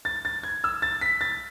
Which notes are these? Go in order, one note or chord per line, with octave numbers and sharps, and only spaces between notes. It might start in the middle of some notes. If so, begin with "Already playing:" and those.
A6
A6
G#6
E6
A6
B6
A6